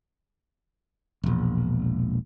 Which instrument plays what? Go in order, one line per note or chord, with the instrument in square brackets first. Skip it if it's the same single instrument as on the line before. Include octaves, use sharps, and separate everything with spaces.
[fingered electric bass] E1 A#1